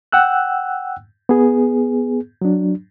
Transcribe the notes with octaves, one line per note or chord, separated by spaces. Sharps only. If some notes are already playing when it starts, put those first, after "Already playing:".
F#5 G5 E6 F#6
B3 G#4
F#3 D4